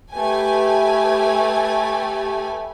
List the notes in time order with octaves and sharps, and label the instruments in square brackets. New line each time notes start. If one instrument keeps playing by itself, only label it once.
[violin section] A3 G4 B4 G#5